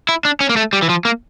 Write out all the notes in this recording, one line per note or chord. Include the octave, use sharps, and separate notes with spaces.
E4
D4
C#4
A#3
A3
G3
E3
F3
A#3